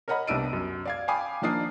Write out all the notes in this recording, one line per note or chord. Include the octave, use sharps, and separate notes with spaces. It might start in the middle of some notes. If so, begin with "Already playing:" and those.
A#4 C#5 D#5 F#5 A#5 B5
C2 B3 D4 E6 D7 D#7
F#2
D5 F5 G#6
F5 G5 G#5 B5 D6 D#6
D#3 F3 A#3 D4 D#6 C7